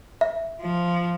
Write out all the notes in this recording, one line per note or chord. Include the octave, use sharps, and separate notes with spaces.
E5
F3